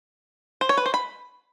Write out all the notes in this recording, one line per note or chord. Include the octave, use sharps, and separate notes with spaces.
C5
C#5
B4
C5
B5